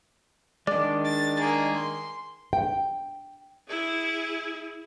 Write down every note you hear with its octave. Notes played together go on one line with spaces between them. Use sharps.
D#3 G#3 D4 D5
A6
A#3 G#4
C6
G5
E4 G#4